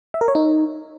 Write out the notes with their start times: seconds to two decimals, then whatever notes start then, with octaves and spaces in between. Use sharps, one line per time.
0.14 E5
0.21 A#4
0.28 C#5
0.35 D#4